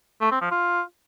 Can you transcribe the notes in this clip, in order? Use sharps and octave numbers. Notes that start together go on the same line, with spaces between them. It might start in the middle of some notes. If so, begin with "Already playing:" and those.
A3
C4
F3
F4